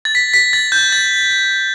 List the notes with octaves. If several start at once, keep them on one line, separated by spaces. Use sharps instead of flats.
A6
B6
B6
A6
G6
A6